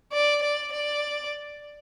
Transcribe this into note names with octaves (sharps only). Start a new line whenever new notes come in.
D5
D5
D5